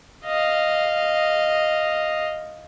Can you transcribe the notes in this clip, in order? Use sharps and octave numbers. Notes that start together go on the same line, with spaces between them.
D#5 F5